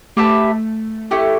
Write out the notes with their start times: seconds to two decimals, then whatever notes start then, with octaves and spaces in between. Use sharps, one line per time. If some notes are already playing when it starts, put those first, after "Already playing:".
0.17 A3 G4 B4 E5 A5
1.11 A3 E4 G4